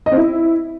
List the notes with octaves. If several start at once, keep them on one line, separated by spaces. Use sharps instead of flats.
D#5
C4
E4